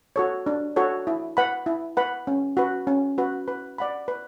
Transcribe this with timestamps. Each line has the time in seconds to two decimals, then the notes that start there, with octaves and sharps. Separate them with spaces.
0.16 F#4 A4 C#5
0.46 D4
0.76 F#4 A4 C#5
1.07 E4
1.37 B4 F#5 B5
1.66 E4
1.97 B4 F#5 B5
2.27 C#4
2.57 F#4 B4
2.87 C#4
3.18 F#4 B4
3.48 B4
3.78 D5 F#5 B5
4.08 B4